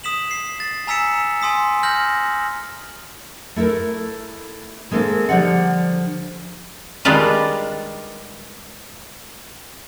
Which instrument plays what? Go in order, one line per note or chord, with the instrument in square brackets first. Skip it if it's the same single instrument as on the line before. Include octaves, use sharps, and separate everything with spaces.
[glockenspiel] D#6 B6 E7 F#7
C7
A6
G#5 A#5 E6 B6 C#7 E7
G#5 C6 D#6 B6
F6 G6 A#6 F#7
[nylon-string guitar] A3 E4 A4 A#4
D#3 G#3 A#3 C4 A4
D3 F3 G3 D5 F#5
[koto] D#3 G3 G#3 D4 F4 B4